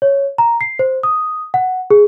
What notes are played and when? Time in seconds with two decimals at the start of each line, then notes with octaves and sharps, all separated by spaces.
0.02 C#5
0.38 A#5
0.61 C7
0.79 C5
1.03 D#6
1.54 F#5
1.91 G#4